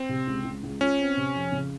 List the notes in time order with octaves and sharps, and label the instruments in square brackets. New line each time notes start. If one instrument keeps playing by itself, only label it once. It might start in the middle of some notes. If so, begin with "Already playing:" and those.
Already playing: [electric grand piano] C4
[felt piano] C3
C#2
C#2
C#2
[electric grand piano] C#4 [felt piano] F4
[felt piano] C4
C3
F2
C#3